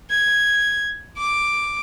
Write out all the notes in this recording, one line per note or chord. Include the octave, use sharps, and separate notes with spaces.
G#6
D6